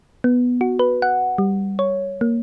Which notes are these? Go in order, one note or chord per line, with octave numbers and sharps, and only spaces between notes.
B3
F#4
B4
F#5
G3
C#5
A#3